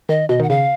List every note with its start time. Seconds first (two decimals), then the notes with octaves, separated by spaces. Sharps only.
0.09 D#3 D#5
0.29 B2 D#5
0.40 D#3 F#5
0.50 C#3 F5